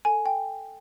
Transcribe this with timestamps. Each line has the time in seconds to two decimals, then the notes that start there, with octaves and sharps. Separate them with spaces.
0.05 A4 G#5
0.26 G5